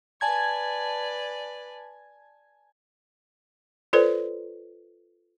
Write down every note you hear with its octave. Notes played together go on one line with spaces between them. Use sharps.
B4 D5 G#5 A5 G#6
F4 A4 B4 C5 D5